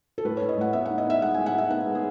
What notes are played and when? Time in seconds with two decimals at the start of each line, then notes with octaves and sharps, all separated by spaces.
0.18 A4
0.25 A2 B4
0.37 A2 C#5
0.49 D#5
0.57 A2 F#5
0.73 B3 E5
0.85 D#4 F#5
0.98 D#5
1.06 B3 E5
1.22 G#3 F#5
1.34 A2 G#5
1.46 F#5
1.54 D#4 E5
1.70 B3 F#5
1.87 G#3
1.95 G#4